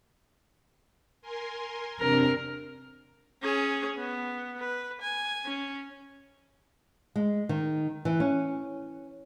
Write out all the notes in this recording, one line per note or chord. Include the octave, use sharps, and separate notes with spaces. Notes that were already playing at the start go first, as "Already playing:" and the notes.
A#4 G#5 C6
C3 C4 D4 A#4
C#4 G#4
B3
B4
G#5
C#4
G#3
D#3
E3
C#4